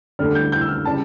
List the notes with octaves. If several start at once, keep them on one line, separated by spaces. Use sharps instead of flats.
D2 D3 G3 F6
G6
G6
E6
F6
C#3 G3 A5